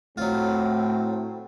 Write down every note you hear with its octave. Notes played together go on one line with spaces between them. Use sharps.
A2 F#3 A3 C4 F4